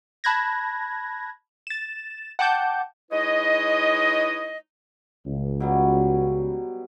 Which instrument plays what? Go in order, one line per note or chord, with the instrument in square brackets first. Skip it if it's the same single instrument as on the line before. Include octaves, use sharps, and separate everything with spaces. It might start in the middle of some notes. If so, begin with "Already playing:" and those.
[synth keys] A5 B5 F#6 G#6 A#6
A6 E7
F#5 G5 A5 D6 G6
[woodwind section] G#3 D#4 E4 B4 C#5 D#5
[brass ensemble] C#2
[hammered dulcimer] B2 F#3 G3